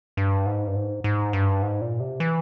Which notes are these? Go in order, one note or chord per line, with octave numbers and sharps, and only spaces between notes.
G2
G#2
G2
G#2
G#2
G2
G#2
A#2
C3
E3